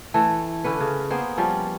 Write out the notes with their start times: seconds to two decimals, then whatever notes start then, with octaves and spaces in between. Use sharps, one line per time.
0.14 E3 A3 A4
0.64 D3 C#4 B4
0.80 C#3
1.10 A#3 B3 G#4 C5
1.38 F3 G3 C#4